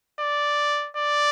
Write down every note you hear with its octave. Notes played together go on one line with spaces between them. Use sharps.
D5
D5